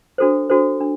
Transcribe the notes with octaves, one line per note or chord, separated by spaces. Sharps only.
D4 F#4 A4 C5
D4 F#4 A4 C5
D4